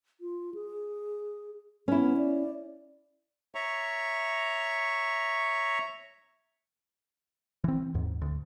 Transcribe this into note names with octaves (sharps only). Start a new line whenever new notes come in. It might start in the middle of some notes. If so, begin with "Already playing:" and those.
F4
G#4
B3 C#4 E4
D5
C#5 E5 A#5 C#6
E3 C4
D#2 G#2
D2